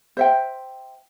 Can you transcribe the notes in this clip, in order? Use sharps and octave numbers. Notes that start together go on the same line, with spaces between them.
C5 E5 G5